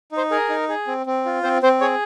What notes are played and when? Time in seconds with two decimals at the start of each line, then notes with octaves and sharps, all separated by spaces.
0.12 D#4
0.17 C5
0.31 G#4 A#4
0.49 D#4
0.69 G#4
0.87 C4
1.06 C4
1.26 F4
1.43 C4 C5
1.62 C4 C5
1.81 G#4 C#5